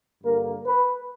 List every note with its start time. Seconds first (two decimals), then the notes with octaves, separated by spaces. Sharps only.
0.24 G2 D3 A#3 A#4
0.66 B4